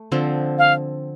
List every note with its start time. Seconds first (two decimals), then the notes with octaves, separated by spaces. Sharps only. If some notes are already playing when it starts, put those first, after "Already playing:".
Already playing: A3
0.12 D3 F3 C4
0.59 F5